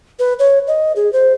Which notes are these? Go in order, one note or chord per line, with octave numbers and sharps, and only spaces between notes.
B4
C#5
D#5
G#4
C5